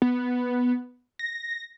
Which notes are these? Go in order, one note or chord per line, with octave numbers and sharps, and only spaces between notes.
B3
A#6